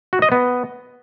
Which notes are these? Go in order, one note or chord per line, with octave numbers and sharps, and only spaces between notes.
F#4
D#5
B3